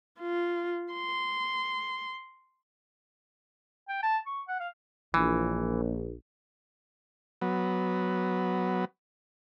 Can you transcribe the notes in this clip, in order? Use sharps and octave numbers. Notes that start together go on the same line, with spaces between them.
F4
C6
G5
A5
C#6
F#5
F5
A#1 E3
F#3 B3